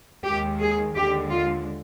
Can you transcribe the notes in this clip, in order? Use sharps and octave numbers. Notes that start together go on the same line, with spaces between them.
D#2 D#3 G#3 G4
G#4
D#2 D3 G#3 G4
F4